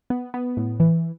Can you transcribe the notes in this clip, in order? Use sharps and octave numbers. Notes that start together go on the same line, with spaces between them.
B3
B3
A2
E3